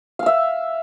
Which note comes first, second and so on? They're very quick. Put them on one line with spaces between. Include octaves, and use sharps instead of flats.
F5 E6 E5